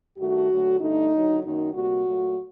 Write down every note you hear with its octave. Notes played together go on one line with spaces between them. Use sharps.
G2 D#3 A3 F#4
D2 D3 F#3 A3
G2 D3 A3 D#4
D#2 D3 F#3
F#2 D#3 F#3 A#3 D#4
D2 C3 G3 A#3 F#4
A#2 F#3 A3